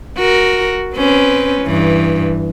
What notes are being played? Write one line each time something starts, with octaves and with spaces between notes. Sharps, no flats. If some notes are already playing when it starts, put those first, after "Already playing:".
F#4 A#4
C4 C#4 B4
G2 E3